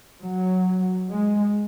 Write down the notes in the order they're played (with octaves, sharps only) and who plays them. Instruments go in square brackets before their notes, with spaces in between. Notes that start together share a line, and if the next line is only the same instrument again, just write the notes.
[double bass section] F#3
G#3